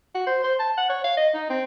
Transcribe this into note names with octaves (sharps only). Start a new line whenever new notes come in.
F#4
C5
C5
A5
F#5
C#5
F5
D#5
D#4
C4